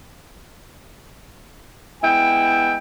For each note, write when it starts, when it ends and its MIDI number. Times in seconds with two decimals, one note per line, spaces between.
2.03 2.77 56
2.03 2.77 59
2.03 2.77 64
2.03 2.77 79